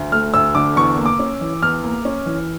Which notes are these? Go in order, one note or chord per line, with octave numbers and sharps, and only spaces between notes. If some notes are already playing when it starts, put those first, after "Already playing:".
Already playing: D2
A3 F6
D2 E6
D3 D6
E2 C#6
A#3
D6
C#4
E3
E2 F6
A#3
C#4
E3